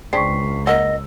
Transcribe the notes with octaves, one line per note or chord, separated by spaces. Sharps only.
C#2 C4 D4 G#4 C#6 B6 C7
A#3 A#4 D#5 F#5 E6